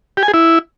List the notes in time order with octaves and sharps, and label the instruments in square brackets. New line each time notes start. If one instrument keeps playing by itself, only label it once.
[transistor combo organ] G4
G#5
G#4
E4